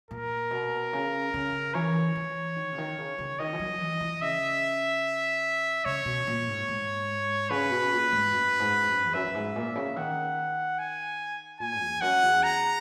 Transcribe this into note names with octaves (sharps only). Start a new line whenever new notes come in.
A#2 A#4
B2
C#3
C#3
E3 C#5
E3
D#3
C#3
D#3
C#3
C#3
D#3 D#5
E3
F#3
E3
E3
C#3 E5
C#3 C#5
B2
A#2
G#2
G#2
C#3 B4
B2
A#2
G#2
F#2
G#2
F#2
E2
F#2 E5
F#2
G#2
A#2
C#3
D#3 F#5
G#5
A#2 G#5
E2
F#2 F#5
E2
A#5